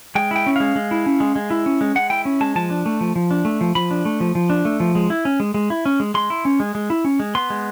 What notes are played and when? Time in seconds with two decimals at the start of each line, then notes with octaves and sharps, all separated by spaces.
0.15 G#3 G5
0.31 E4 G5
0.46 C#4
0.56 G#3 F5
0.76 G#3
0.91 E4
1.06 C#4
1.20 G#3
1.36 G#3
1.50 E4
1.66 C#4
1.81 G#3
1.95 G#3 F#5
2.10 E4 G5
2.25 C#4
2.41 G#3 A5
2.56 F3 A5
2.70 D4
2.86 A3
3.01 F3
3.16 F3
3.31 D4
3.45 A3
3.61 F3
3.75 F3 B5
3.91 D4
4.05 A3
4.20 F3
4.35 F3
4.50 D4
4.65 A3
4.80 F3
4.95 G#3
5.10 E4
5.25 C#4
5.40 G#3
5.54 G#3
5.70 E4
5.85 C#4
6.00 G#3
6.14 G#3 C6
6.30 E4
6.45 C#4
6.60 G#3
6.75 G#3
6.90 E4
7.05 C#4
7.20 G#3
7.35 B3 C6
7.50 G#3